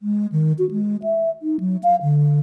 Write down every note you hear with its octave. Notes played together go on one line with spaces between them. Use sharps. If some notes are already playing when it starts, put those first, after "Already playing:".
G#3
D#3
F#4
G#3
E5
D#4
F#3
F5
D3